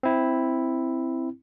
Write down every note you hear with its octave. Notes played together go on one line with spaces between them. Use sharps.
C4 E4